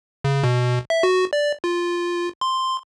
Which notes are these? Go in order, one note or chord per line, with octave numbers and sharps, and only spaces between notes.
C#3
B2
E5
F#4
D5
F4
C6